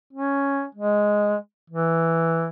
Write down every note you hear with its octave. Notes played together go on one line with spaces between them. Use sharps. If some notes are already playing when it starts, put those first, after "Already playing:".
C#4
G#3
E3